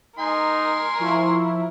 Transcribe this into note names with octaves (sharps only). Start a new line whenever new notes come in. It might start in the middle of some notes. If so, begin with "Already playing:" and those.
D#4 A#4 G#5 C6
F3 E4 C#6